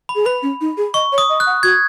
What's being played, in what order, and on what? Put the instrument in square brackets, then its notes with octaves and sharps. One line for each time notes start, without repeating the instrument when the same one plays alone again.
[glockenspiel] B5
[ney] G#4
[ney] B4 [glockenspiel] B5
[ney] C#4
D#4
G#4
[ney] D#5 [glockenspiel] C#6
[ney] C#5
[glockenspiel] D#6
[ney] D#5
[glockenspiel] F#6
[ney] F#5
[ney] F#4 [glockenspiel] G#6